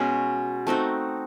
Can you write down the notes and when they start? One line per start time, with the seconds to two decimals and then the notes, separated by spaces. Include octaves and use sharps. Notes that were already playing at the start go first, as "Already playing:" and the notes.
Already playing: B2 G#3 C#4
0.67 A3 C4 D#4 F#4